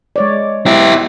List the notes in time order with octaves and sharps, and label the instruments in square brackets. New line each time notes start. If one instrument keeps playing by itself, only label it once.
[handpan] G#3 C#5 D5
[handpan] B3 [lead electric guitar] E4 G4